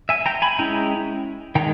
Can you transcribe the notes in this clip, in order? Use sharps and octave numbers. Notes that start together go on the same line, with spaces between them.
E5 G#5
G5 A#5
G#5 B5
G#3 C#4 E4 G5 A#5
D#3 G#3 G5 A#5